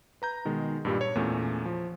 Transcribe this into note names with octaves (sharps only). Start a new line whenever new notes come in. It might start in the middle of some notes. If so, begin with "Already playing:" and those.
B4 A#5 G6
B2 D#3 G#3
G2 A#2 G3
C#5
E2 A#2 A3 C#4
F3